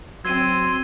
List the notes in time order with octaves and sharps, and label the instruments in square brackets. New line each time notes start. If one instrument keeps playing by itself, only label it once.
[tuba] F#3 [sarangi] C4 [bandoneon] C6 E6 [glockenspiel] G#6 D#7